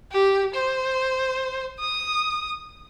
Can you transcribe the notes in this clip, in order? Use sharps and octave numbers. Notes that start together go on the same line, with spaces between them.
G4
C5
D#6